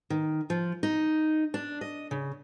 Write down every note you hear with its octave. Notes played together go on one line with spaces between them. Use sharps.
D#3
F3
D#4
D4
D#5
C#3